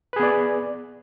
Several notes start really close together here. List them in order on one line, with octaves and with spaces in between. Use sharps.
B4 G#4 B3 D5